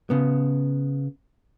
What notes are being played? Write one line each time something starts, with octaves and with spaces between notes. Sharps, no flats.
C#3 B3